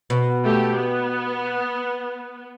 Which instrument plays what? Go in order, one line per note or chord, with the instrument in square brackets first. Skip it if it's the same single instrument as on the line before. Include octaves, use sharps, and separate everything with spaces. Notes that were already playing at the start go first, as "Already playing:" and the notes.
[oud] B2
[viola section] A3 G4
B3